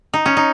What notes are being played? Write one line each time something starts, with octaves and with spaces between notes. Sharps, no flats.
D#4
C#4
D#4